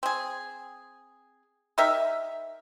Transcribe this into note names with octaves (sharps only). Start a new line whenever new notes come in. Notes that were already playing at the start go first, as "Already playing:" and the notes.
C4 G#4
D#4 G4 A#4 E5